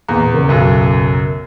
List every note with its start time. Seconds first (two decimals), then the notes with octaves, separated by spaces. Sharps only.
0.08 E2 A#2 A#5
0.30 D#2 C#3 A#4
0.49 B1 F#2